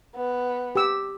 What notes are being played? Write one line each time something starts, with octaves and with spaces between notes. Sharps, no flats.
B3
G4 E6